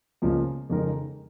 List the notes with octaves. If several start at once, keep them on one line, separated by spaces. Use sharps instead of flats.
C#2 C#3 F3 A#3
F2 C#3 G#3 D#4 A#4